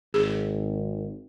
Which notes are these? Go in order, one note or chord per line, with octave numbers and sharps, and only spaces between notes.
G#1 G#4